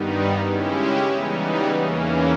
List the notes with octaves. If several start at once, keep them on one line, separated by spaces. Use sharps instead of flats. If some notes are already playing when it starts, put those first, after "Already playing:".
Already playing: G2 D#3 G3 B3 D#4
C#3 G#3 C#4 E4 G4
C#3 E3 G3 B3 D#4
E2 C#3 E3 A#3 C#4